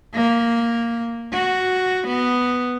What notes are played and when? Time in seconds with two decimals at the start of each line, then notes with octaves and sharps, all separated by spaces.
0.14 A#3
1.33 F#4
2.08 B3